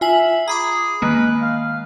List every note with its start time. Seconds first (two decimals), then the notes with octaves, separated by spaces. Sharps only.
0.01 F4 E5 G#5 F#7
0.48 G#4 A#5 B5 D6
1.02 D#3 G#3 A#3 B4
1.42 F5